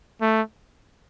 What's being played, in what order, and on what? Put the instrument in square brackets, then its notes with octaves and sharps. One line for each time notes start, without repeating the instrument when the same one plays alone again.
[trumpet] A3